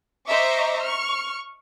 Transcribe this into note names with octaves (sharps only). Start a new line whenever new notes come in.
C5 D#5 E5 A#5 C#6 D6
C#6 F6